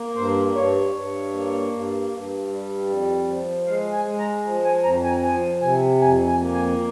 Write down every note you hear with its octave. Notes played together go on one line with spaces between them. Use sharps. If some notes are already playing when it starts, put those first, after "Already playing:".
Already playing: A#3
G2 C5
G2 C#5
G2
A#3
G2
G2
G3
F2
F3
G#3 F5
G#5
G#3
A#5
F3
G#5
F2 A#5
G#5
F3 G#5
C3 G#5
F2 G#5
G#5
A#3
G#5